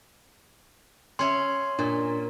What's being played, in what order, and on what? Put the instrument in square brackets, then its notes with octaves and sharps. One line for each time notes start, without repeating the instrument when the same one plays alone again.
[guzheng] C#4 C#5 E5 [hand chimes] C6
[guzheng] A#2 [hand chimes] D4